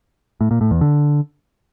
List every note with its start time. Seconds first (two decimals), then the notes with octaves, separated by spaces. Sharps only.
0.41 A2
0.51 A#2
0.61 A2
0.71 E2
0.81 D3